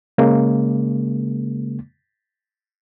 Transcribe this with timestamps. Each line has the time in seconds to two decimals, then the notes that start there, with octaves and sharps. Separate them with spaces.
0.18 C#3 G#3 A#3